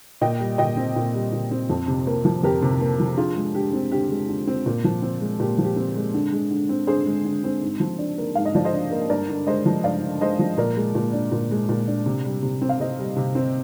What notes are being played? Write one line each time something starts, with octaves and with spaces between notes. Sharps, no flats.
A#2 D#5 G5
G3
A#2 D#5 G5
C4
A#2
G3
A#2
C4
F2
C3
A#3
F3
F2 G4 A#4
C3
A#3
F3
D3 F4 G#4
G#3
D3 G4
C4
D3 G4
G#3
D3
C4
A#2
F3
C4
G#3
A#2 G4
F3
G4
C4
G#3
D3
G#3
D3
C4
D3 G#4 C5
G#3
D3
C4
G#2
F3
D4
A#3
G#2 F5
D#5
F3 D5
C5 D#5
D4
A#3
G2 A#4 D5
D3
G#3 C5 D#5
F3
G2 D5 F5
D3
G#3 C5 D#5
F3
A#2 A#4 D5
G#3
A#2
D4
A#2
G#3
A#2
D4
C3
G3
C3
C4
F5
C3 C5 D#5
G3
C3
C4